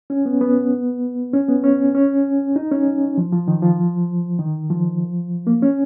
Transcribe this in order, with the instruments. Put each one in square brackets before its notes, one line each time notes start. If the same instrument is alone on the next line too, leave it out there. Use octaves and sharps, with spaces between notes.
[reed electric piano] C#4
B3
B3
C#4
B3
C#4
C#4
D#4
C#4
F3
F3
D#3
F3
D#3
F3
A#3
C#4